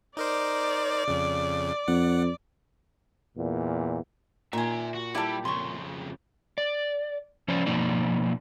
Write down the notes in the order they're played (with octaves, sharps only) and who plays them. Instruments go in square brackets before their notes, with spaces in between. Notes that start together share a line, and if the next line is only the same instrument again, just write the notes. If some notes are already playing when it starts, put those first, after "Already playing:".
[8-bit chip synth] D#4 A#4 C5 [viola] D5
[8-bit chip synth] F2 C#3
[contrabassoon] F2 [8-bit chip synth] F#5
[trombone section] E2 A#2
[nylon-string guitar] A#2 [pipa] D#3 G#5 [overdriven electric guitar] E5 C6
[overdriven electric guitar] F#4
[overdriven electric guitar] G3 [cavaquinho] E4 G4 B5 [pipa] A4 D5
[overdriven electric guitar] F2 C#3 [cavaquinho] C6 C#6
[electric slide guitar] D5
F3 C#4 C5 D5
B2 F3 A#3 D#4 D5